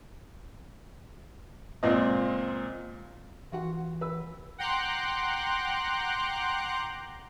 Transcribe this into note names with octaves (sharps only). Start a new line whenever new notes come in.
C#2 A#2 C4 D#5
E3 F4 F#4 F#5
B4 B5 E6
F#5 G5 A#5 C6 D6 F#6